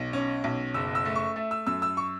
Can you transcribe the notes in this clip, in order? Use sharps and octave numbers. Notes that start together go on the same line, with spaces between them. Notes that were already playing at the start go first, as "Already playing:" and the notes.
Already playing: B1
C#4
B1
F#1 E6
E6
A3
C#6
A3 E5
E6
F#2 E6
E6
C#6